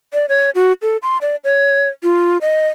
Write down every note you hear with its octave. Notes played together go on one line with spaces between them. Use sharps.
D5
C#5
F#4
A4
C6
D5
C#5
F4
D#5